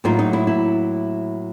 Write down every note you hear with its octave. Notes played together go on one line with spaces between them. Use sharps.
A2 F#3 A#3 D#4 F4
D#4
E4
E4